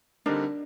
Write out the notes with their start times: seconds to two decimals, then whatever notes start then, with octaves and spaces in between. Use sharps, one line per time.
0.26 D3 G3 C4 D4 D#4 A#4